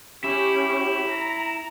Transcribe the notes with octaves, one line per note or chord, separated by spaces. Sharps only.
C#4 E4 G4
A#5